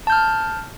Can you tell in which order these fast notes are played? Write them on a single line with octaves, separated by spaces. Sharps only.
A5 G6 F6